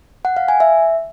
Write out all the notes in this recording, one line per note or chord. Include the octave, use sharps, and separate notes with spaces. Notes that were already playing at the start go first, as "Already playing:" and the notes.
F#5
F5
G#5
E5